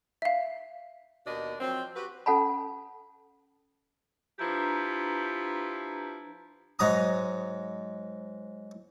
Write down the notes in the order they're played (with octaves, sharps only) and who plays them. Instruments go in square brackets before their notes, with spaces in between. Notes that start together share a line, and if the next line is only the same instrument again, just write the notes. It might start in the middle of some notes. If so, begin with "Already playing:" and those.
[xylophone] E5 F5
[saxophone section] D#2 B2 D4 A#4 D#5
F3 F#3 C4
F#4 G4 B4
[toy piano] C#4 A4 F#5 A5 B5
[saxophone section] F3 E4 G4 [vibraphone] D4 B4 A#5
[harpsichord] G#2 F#3 A#5 D#6